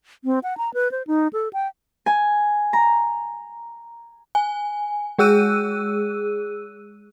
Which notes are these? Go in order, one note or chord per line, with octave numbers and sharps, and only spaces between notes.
C4
F#5
A#5
B4
C5
D#4
A4
G5
G#5
A#5
G#5
G#3 G#4 E6 F#6 D#7